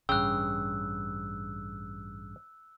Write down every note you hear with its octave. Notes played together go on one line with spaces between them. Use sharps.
A1 G2 C#3 G5 E6 F#6